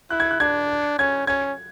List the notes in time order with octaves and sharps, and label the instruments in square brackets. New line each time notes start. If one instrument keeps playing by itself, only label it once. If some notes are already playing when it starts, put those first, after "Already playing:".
[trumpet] E4 [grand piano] F#6
[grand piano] G#6
F#6
[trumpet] D4 [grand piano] G#6
[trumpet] C#4 [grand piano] G#6
[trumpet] C#4 [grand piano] G#6